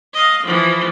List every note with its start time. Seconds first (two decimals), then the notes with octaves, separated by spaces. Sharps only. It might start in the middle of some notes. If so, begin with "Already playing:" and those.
0.14 D#5 F5
0.43 E3 F3